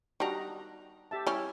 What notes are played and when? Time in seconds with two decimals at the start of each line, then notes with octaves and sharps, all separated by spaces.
0.20 G3 D4 D#4 F#4 A#5
1.11 G4 E5 A5
1.27 G3 C#4 E4